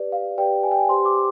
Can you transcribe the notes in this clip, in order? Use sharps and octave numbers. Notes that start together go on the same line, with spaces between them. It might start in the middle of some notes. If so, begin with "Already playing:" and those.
Already playing: G4 B4 D5
F5
G4 B4 D5 G5
G#5
G5
G#5
G4 C5 C6
D6